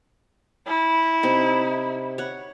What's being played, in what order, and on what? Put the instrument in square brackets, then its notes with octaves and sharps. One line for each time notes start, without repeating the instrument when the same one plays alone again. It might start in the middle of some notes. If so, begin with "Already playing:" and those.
[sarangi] E4
[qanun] C3 C4 D#4
C#5 F#5